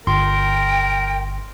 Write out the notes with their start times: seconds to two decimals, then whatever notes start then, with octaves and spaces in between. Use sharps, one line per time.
0.07 G1 A#4 G5 C6